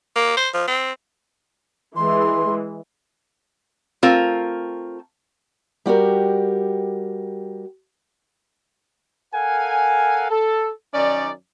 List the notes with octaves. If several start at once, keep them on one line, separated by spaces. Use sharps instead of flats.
A#3
C5
F3
C4
E3 G#3 C6
A3 C4 F4 A#4
G3 F#4 G4 A#4
A4 A#4 F5 F#5 G#5
A4
F#2 D#3 C#4 D#4 D5